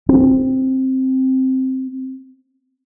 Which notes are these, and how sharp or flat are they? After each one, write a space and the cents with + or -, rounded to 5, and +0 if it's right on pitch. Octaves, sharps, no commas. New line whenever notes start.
C4 +5